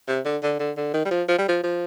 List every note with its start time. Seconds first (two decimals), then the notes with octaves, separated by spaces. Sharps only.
0.08 C3
0.25 D3
0.43 D3
0.59 D3
0.77 D3
0.94 D#3
1.05 G3
1.11 F3
1.28 F3
1.39 G3
1.48 F3
1.63 F3